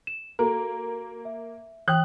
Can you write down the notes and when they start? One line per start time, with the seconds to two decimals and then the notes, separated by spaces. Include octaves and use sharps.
0.07 E7
0.39 A#3 F#4 A4 A#5
1.25 E5
1.88 E3 G5 D#6 F#6